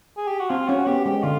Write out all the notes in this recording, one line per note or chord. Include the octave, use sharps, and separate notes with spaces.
G#4
G4
F#4
C4 F4
C#4 F#4
B3 G4
G#3 G4
D3 F4